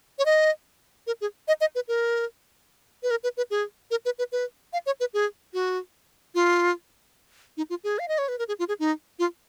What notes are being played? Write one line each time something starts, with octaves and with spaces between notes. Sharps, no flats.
C#5
D#5
A#4
G#4
D#5
D#5
B4
A#4
B4
A#4
B4
B4
G#4
A#4
B4
B4
B4
F5
C#5
B4
G#4
F#4
F4
D#4
F4
G#4
F5
D#5
C#5
B4
A#4
G#4
F4
G#4
D#4
F4